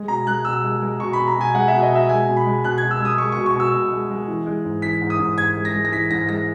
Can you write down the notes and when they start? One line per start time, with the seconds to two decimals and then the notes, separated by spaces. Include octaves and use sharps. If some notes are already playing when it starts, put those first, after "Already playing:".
Already playing: G#3
0.08 B2 A#5
0.27 G#3 F#6
0.45 B2 E6
0.64 G#3
0.82 G#3
1.00 B2 C#6
1.13 B5
1.18 B2
1.27 A#5
1.36 B2 G#5
1.55 G#3 F#5
1.68 E5
1.72 B2
1.82 D#5
1.91 B2 E5
2.09 G#3 G#5
2.28 B2
2.37 B5
2.46 G#3
2.64 B2 F#6
2.78 G#6
2.83 B2
2.91 E6
3.00 G#3
3.05 D#6
3.18 G#3 C#6
3.32 C#6
3.37 B2
3.46 C#6
3.55 B2 E6
3.74 B2
3.91 G#3
4.10 G#3
4.28 E3
4.46 G#3
4.65 G#2
4.82 E3 B6
5.01 G#2
5.10 D#6
5.19 G#2
5.38 G#2 G#6
5.56 G#3
5.65 A#6
5.74 G#3
5.85 A#6
5.92 E3 B6
6.11 G#2 A#6
6.29 G#3 A#6